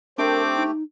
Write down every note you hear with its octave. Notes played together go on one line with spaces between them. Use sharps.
A3 C4 D4 G4 A#4 E5 D6
D#4